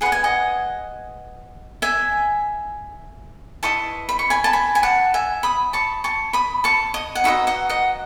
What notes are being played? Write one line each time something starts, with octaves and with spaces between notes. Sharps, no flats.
G#4 B4 D#5 F#5
G#5
D#5 F#5
E5 G#5
E4 B4 D#5 A5 C#6
B5
C#6
G#5 B5
A5
G#5 B5
G#5
F#5 A5
E5 G#5
B5 D#6
A5 C#6
A5 C#6
B5 D#6
A5 C#6
D#5
F#5
D#4 F#4 B4 D#5 E5
D#5 F#5
D#5 F#5